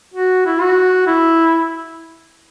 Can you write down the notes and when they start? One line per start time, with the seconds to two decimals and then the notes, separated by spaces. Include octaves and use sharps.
0.14 F#4
0.46 E4
0.61 F#4
1.07 E4